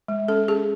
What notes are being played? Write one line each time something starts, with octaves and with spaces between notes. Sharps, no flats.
G#3
C#4 A4
C#4 G#4